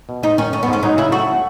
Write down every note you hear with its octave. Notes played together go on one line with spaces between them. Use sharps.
B2
G#2 D#4
D#3 C#4
A3 C#4
B3
G#2 C#4
F#3 D#4
C#3 E4
A3 F#4